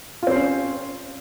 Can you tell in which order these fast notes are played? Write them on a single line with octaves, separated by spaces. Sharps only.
F4 C4 C5 C#4